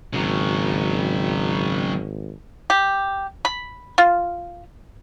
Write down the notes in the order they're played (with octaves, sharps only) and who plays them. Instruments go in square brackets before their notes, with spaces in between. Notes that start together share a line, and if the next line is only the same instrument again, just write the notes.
[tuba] G#1 [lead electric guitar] C#3 F#3
[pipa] G4
B5
F4